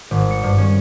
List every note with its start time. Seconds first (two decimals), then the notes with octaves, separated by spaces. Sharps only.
0.11 G#1
0.31 C#7
0.43 G2
0.58 C#4